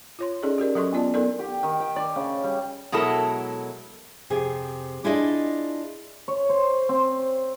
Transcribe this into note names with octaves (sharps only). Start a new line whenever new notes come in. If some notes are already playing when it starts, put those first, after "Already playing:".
F4 C#5 C6
C#4 D#4 G#4 A4 D5 D#5
F#4 G4 A#4 D5
F#3 C#4 A4 D#5 C6 C#6
B3 F4 D5 A5
B3 D#4 A4 A#4 D5
G4
D#3
G5
D5
C#3
G3
B2 F#3 G#3 E4 A4 A#4
F2 C3 G4 G#4
D4 E4 F4 G#4 D5 D#5
C#5
C5
C4